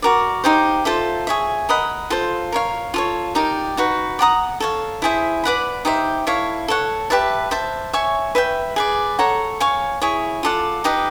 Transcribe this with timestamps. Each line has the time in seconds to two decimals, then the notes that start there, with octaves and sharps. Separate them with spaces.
0.02 F#4 A#4 D5
0.44 D#4 G4 C5 F5
0.85 F4 A4 C5 E5
1.27 G#4 C#5 E5
1.69 A#4 D#5 F#5 B5
2.10 F4 A4 C5
2.52 A#4 C#5 F5
2.94 F4 A4 C#5
3.35 D#4 G4 A#4 D5
3.77 D#4 F#4 B4
4.19 D5 F#5 A#5 D#6
4.60 A4 C#5 F5
5.02 E4 G#4 C5 E5
5.44 B4 D5 F#5 B5
5.85 D#4 G4 C5 E5
6.27 E4 A4 C#5 F5
6.68 A4 C#5 F#5
7.10 G4 B4 E5 A5
7.51 C5 E5 A5
7.93 C#5 E5 G#5 C#6
8.35 B4 E5 G5
8.76 G#4 B4 D5
9.19 A4 C#5 F#5 A#5
9.60 C#5 F5 G#5 C#6
10.02 E4 G#4 C#5
10.43 F4 A4 D5 F#5
10.84 D#4 G4 B4 D#5